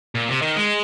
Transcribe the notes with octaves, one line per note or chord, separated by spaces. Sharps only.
A#2
C3
D#3
G#3